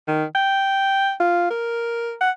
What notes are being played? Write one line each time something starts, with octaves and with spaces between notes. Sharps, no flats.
D#3
G5
F4
A#4
F#5